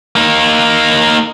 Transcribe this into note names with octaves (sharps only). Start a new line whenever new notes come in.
A#3 D#4